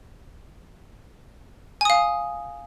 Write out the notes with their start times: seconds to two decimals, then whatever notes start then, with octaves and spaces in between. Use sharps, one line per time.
1.81 G#5
1.85 D#6
1.90 F5